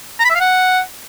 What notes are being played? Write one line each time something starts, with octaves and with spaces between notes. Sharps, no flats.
A#5
B5
E5
F5
F#5